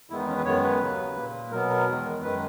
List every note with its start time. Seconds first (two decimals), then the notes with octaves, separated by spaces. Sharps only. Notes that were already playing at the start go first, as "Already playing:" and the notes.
0.10 E2 D#3 G#3 B3 E4
0.18 D#4
0.28 C#4
0.36 B4
0.45 F#2 D#3 G#3 B3 C#5
0.63 B4
0.81 D#2 C#3 F#3
1.16 A#2 A#3
1.52 B2 F#3 B3 A#4
1.69 A#4
1.87 E2 D#3 G#3
2.23 F#2 D#3 G#3 B4